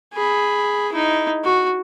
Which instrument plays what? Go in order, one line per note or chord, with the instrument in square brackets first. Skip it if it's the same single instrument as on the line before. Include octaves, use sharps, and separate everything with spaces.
[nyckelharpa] G#4 B5
D#4 E4
F#4